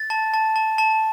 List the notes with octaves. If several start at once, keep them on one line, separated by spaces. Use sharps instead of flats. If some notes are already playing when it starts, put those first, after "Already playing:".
Already playing: A6
A5
A5
A5
A5